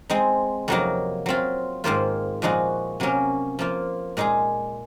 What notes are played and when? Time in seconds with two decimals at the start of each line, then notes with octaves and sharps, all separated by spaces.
0.10 G#3 C4 D#4
0.68 F2 C3 F#3 A#3 D#4
1.26 F#3 C4 F4
1.84 G#2 D#3 A#3 F4 C5
2.42 A#2 F3 G#3 D#4 F#4
3.00 C3 F#3 A#3 C#4
3.59 F3 A#3 F4
4.17 A#2 G#3 D#4 G#4